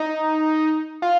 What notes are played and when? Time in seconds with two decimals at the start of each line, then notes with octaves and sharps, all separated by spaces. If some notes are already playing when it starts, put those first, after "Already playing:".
Already playing: D#4
1.02 F4